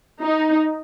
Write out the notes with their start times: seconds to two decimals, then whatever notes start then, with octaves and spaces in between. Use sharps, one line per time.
0.22 D#4